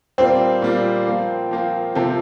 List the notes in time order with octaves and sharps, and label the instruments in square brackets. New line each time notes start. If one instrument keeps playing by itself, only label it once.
[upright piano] A#2 G3 A#3 [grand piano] C4
[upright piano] A#2 G3 A#3
F3 A#3 F4
F3 A#3 F4
C3 F3 C4 F4 A4